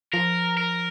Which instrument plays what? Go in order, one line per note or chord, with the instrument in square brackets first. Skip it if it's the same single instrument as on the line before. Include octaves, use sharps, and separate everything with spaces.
[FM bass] F3 [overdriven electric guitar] A#4
[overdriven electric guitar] A#4